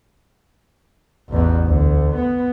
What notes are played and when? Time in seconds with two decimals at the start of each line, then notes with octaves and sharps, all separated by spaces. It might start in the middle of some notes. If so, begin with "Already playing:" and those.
1.29 A1 E2
1.66 D2
2.16 B3